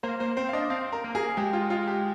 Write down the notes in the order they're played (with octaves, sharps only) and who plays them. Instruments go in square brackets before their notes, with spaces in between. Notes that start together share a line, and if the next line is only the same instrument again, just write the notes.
[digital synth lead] A#3 [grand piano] C5
[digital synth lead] A#3 [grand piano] C5
[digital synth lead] C4 [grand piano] C5
[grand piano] F5
[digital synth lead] D4 [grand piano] D#5
[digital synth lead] C4 [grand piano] F5
[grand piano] A#4
[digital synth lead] A#3
[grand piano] G#4
[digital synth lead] G#3 [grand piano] G4
[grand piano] F4
F4
G4